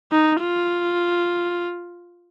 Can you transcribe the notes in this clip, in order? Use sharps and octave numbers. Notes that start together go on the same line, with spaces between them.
D#4
F4